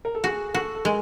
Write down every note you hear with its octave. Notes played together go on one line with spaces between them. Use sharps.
A#4
A4
F#4 G#4
F#4 A4
A4
G#3 A#4